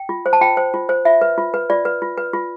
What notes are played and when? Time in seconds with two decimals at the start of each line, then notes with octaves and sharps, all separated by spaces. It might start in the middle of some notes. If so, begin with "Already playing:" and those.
Already playing: G5
0.09 F4
0.26 C5
0.33 A5
0.41 F4 G5
0.57 C5
0.74 F4
0.89 C5
1.05 F4 E5
1.21 B4
1.38 F4
1.54 B4
1.70 F4 D5
1.85 B4
2.02 F4
2.17 B4
2.33 F4